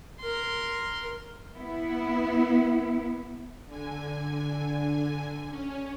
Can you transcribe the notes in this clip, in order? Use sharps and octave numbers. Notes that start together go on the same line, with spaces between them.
A#4 C6
B3 E4
D3 G#5
C#4